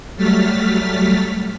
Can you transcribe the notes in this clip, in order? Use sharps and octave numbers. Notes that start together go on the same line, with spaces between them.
F#3 G3 A3 F6 A6 B6